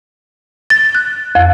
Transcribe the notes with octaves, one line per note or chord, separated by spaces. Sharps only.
A6
F#6
F2